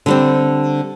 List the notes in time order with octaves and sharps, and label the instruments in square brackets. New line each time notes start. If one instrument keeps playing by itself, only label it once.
[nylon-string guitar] D3 G3 C4